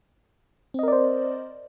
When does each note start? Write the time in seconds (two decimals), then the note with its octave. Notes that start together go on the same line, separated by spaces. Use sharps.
0.74 C4
0.79 D#5
0.83 A#4
0.88 D5
0.92 C5